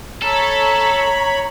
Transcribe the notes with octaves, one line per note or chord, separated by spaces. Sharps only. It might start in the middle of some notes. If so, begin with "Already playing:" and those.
A4 C#5 A#5 B5